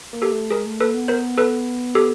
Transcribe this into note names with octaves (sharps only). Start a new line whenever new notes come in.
A#3
G4 A4
A3
G#3 G#4 A#4
A3
A#3 A4 B4
B3
A#4 C5
A4 B4
G4 A4